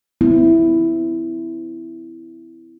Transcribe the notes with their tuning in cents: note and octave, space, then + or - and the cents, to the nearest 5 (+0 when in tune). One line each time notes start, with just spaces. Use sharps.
C4 -40 E4 +0